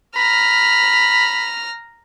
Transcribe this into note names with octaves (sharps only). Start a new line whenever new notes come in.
A#5 B5 F6